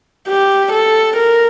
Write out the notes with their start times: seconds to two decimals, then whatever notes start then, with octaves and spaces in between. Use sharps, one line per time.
0.28 G4
0.72 A4
1.16 A#4